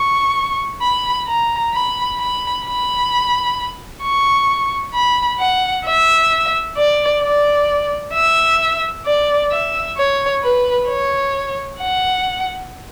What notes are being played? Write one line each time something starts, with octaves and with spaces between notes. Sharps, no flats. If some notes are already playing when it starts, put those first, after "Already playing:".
Already playing: C#6
B5
A#5
B5
B5
B5
C#6
B5
F#5
E5
D5
D5
E5
D5
E5
C#5
B4
C#5
F#5